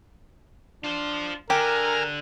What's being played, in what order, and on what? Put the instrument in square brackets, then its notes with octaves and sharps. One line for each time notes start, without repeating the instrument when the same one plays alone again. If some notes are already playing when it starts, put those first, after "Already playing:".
[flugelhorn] D4 [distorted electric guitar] F4 C5
[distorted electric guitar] D3 [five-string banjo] G4 [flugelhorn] A#4 [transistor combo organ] G#5 A#5 F6